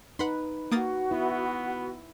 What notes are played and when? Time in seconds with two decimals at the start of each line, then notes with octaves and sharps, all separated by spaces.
0.19 D#4 B4 F#5 B5 C6
0.71 A#3 F#4 D#6 A6
1.11 B3 E4